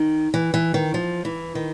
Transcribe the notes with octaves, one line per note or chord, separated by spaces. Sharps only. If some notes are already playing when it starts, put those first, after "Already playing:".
Already playing: D#3
E3
E3
D#3
F3
E3
D#3